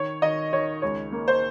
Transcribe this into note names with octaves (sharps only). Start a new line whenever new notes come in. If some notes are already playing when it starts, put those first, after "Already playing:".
Already playing: D#3 C#5
D#3 D#5
D#3 C#5
C#2 C#5
A#3
C5